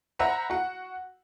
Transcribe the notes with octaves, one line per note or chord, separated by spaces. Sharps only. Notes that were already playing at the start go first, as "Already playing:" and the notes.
C5 E5 F#5 A#5 B5
F#4 F#5